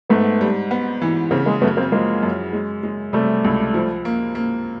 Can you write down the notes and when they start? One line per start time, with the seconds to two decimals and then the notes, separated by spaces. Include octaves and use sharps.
0.09 G#2 A3 B3
0.41 G3
0.71 B3
1.02 E3
1.31 C#3 A#3 C4
1.46 G#3 A#3
1.61 F#2 A3 B3
1.77 A#3 C4
1.92 F3 G#3 A#3
2.23 F#2
2.53 G#3
2.83 G#3
3.13 C3 G3 A3
3.44 C#2
3.74 F3
4.05 A#3
4.35 A#3